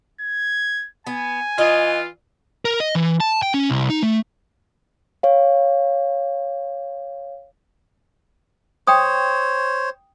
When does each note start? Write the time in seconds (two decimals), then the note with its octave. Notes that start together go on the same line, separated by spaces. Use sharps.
0.21 G#6
1.07 B3 G#5
1.58 E3 F4 D#5
2.65 A#4
2.80 D#5
2.95 E3
3.20 A5
3.42 G5
3.54 C#4
3.70 C2
3.89 D#4
4.02 A3
5.23 C#5 F5
8.87 C5 C#5 G5 D#6